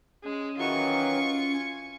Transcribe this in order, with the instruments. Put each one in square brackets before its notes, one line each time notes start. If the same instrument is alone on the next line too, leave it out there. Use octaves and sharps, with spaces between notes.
[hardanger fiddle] G#3 [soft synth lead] C#4
[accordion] D#3 E3 F#3 [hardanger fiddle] F4 C#6
[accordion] G#5